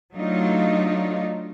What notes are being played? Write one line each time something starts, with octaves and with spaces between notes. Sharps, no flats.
F#3 A3 D4 D#4 F4